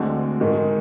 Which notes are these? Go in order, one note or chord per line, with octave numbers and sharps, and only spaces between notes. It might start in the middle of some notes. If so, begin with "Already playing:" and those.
Already playing: D2 D3 G#3 C4
G#2 D#3 G#3